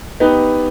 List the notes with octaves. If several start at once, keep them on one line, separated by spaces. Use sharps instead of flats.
B3 D#4 G4 B4